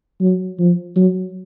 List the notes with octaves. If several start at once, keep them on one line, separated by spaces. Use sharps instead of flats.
F#3
F3
F#3